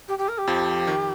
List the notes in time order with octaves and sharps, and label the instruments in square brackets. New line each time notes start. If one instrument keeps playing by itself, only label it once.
[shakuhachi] G4
G4
A#4
G4
[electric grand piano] F2 F3
D#3